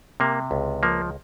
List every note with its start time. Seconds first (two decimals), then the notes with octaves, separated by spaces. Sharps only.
0.20 C3 A#3
0.51 C#2
0.83 F3 A#3